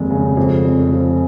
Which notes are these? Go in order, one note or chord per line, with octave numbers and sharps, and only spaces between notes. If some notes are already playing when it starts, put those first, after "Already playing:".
Already playing: F1 D#2 G#3
C#3
F2
F1
F3